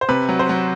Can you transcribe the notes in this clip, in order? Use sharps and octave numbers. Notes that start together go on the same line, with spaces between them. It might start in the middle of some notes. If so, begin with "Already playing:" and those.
C5
C3 B4
F#3
C5
F#3